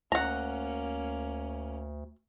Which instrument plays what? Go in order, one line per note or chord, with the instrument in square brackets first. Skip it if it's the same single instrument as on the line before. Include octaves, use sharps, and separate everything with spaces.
[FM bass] D2 [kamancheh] A#3 C#4 [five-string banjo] F#5 A#5